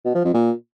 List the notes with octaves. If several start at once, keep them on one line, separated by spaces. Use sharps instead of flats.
B2
F3
F2
A#2